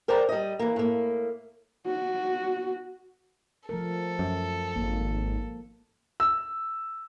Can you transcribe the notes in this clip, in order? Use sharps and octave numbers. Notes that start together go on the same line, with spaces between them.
A#4 C5 D5 G5 A#5
G3 D#5
E3 A#3
A2 A#3
F#4
F3 A3 A4 A#4
F#2
G#1 A#3
E6